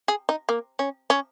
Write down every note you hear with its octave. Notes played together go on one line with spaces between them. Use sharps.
G#4
D#4
A#3
C#4
C#4